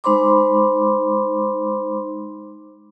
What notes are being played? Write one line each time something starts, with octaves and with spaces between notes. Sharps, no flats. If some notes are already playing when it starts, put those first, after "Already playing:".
G#3 D#4 C5 B5 C6 D6